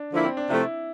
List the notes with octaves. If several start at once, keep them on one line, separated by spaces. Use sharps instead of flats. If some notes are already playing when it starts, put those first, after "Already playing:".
Already playing: D4
D3 F3 A#3 E4
C4
D4
C3 F3 A3 C4 E4